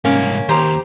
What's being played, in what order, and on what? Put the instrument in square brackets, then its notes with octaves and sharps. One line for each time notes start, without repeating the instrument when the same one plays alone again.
[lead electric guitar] C2 G#2 [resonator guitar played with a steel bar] A#3 C#4
[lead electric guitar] D#2 [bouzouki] G4 C5 A#5